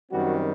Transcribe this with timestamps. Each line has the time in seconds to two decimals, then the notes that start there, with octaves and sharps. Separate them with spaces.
0.12 F#2 D#3 G3 C4 F#4